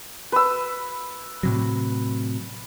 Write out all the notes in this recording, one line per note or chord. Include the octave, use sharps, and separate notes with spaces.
B4 E6
A2 C3 F#3